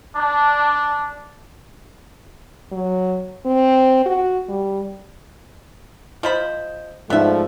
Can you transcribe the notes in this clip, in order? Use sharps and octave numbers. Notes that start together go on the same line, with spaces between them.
D4
F#3
C4
F#4
G3
F3 C5 D#5 B5
G#2 F3 A3 B3 D#4 D5 E5